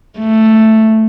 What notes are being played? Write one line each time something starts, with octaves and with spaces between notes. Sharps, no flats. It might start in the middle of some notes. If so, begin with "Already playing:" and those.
A3